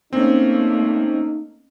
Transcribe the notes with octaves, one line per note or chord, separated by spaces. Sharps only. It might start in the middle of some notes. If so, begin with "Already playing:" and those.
A3 A#3 C4 C#4 D#4